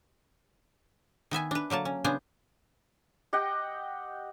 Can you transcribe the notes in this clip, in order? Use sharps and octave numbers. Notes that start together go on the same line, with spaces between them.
D#3 B3 E5 G#5
D4 B4
D3 F#3 A#3 A5
C#4
C#3 B3 D4 C5 G#5
G4 D#5 F#5 G5